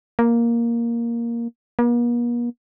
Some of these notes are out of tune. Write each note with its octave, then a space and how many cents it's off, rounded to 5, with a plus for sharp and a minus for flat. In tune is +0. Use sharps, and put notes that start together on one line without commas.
A#3 +5
A#3 +45